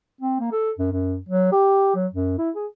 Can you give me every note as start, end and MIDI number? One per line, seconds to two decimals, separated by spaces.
0.21 0.39 60
0.40 0.49 58
0.52 0.71 69
0.79 0.89 42
0.92 1.17 42
1.29 1.49 54
1.52 1.94 67
1.95 2.07 54
2.13 2.35 42
2.38 2.50 64
2.55 2.66 68